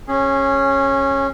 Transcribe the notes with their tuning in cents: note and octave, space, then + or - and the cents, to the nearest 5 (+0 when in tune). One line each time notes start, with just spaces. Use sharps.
C#4 -15 G#4 +0